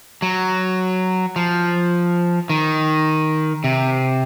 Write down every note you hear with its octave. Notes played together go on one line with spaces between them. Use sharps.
F#3
F3
D#3
C3